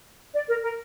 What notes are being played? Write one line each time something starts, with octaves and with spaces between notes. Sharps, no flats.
D5
A#4
A#4